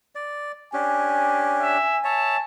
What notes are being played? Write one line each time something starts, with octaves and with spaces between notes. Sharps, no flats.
D5
C#4 D4 G4 G#5
E5
C#5 E5 A5